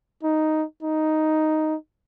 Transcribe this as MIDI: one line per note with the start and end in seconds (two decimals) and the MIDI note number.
0.23 0.64 63
0.82 1.75 63